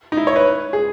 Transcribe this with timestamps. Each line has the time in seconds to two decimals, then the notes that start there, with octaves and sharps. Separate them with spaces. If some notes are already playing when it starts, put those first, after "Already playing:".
0.12 D#4
0.17 E4
0.27 C#5
0.36 B4
0.73 G#4